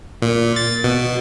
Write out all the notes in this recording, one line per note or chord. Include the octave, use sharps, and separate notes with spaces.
A#2
A6
B2